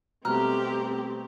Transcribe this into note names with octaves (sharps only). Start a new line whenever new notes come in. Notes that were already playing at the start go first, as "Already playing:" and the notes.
B2 G3 A3 C4 G4 A#5 F6 F#6